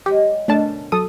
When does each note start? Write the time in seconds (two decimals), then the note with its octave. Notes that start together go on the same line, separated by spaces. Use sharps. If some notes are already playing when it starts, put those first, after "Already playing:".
0.06 F#3 G#3 G4
0.48 F#2 B2 D3 A3 D4 A5
0.92 F#3 A4 D#6